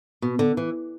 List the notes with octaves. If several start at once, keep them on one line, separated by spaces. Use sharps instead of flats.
B2
D3
E3